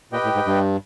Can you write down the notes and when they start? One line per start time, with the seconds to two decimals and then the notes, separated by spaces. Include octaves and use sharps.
0.12 A#2 G4 B4 D#5 G5
0.24 A2
0.35 G#2
0.46 G2